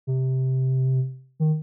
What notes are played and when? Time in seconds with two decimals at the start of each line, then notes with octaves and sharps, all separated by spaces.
0.07 C3
1.40 D#3